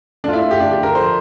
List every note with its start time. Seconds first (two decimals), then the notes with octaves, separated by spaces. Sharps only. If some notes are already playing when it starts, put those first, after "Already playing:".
0.24 A3 D4
0.28 F4
0.33 E4
0.42 A3
0.51 G4
0.60 D3 D4
0.71 G4
0.78 D3
0.83 A#4
0.95 F3 C5